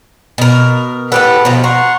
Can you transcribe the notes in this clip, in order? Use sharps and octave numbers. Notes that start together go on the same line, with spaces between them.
B2 A#4
A2 G4 A4 B4 F#5
B2 F3 A#5
F#5 A#5 C6 C#6